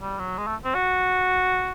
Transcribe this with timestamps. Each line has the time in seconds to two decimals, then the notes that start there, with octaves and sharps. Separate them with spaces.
0.01 G3
0.19 F#3
0.38 G#3
0.47 A3
0.64 C4
0.74 F#4